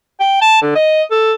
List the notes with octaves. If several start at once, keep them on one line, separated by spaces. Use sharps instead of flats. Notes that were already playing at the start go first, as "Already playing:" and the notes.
G5
A5
D3
D#5
A4